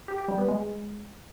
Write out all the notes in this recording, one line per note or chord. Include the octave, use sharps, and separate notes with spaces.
G4
G4
G3
B3
G#3